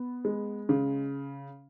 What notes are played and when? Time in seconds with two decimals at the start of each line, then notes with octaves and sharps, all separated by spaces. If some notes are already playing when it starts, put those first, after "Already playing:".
Already playing: B3
0.25 G#3
0.69 C#3